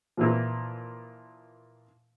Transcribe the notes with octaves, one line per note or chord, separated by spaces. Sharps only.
A#2 E3 F3